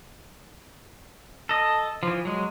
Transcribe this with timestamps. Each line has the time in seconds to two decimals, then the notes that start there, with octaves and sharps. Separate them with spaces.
1.49 A4 D#5
2.03 E3 F3
2.25 F#3 G#3